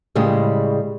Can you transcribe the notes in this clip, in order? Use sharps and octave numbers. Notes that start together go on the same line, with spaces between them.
A2 C#3 G3 G#3